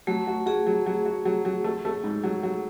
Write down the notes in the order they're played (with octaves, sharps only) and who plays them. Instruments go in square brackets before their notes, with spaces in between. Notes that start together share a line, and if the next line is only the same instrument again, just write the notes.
[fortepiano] F#3 [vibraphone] A3
[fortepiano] F#4
[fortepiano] F#4 [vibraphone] G#4
[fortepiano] F#3
F#3
F#4
F#3
F#3
A3
A3
G#2
F#3
F#3